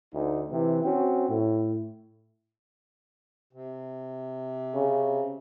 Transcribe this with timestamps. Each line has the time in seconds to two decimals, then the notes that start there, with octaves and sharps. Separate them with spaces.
0.15 D2 D#4
0.52 C3 E3
0.84 C4 C#4 F#4
1.29 A2
3.53 C3
4.74 C#3